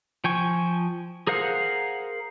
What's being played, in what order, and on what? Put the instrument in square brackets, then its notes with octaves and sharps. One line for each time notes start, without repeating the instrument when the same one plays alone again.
[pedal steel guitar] F3 G5 G#5 C#6
G#4 A#4 C5 F5 F#5